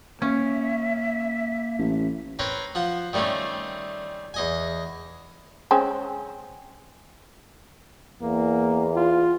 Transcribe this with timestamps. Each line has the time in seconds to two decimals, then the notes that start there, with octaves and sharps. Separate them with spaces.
0.22 A#3 C#4 E5
1.79 A1
2.39 C4 A#4 B4 C#5
2.75 F3 F#5
3.13 D#3 G3 A3 C4 C#4
4.34 E2 D#5 G#5
5.71 G#3 C4 C#4
8.22 E2 A#3
8.96 F4